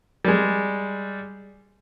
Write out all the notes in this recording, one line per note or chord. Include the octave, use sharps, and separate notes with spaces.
G3 G#3